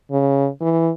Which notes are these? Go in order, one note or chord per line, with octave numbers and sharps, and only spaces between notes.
C#3
E3